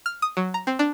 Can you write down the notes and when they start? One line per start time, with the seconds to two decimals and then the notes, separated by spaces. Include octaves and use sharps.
0.06 F6
0.22 D#6
0.37 F#3
0.54 A#5
0.67 C4
0.79 D4